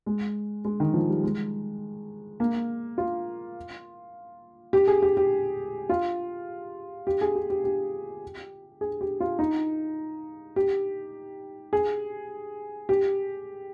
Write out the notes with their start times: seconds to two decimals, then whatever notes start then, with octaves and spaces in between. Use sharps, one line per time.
0.06 G#3
0.65 G#3
0.80 D#3
0.94 F3
1.09 G3
1.24 G#3
2.40 A#3
2.98 F4
4.73 G4
4.88 G#4
5.02 G4
5.17 G4
5.89 F4
7.07 G4
7.21 G#4
7.35 G4
7.50 G4
7.64 G4
8.81 G#4
9.01 G4
9.20 F4
9.39 D#4
10.56 G4
11.73 G#4
12.89 G4